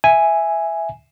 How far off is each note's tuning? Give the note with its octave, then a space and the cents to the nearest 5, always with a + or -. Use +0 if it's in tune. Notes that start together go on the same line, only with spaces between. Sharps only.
E5 +0 G#5 +0